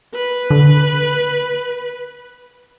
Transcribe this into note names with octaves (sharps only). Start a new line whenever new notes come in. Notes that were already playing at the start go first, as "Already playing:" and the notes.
B4
D3